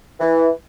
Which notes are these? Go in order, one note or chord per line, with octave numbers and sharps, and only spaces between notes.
E3